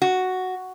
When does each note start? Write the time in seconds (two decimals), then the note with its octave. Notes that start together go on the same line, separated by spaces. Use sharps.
0.02 F#4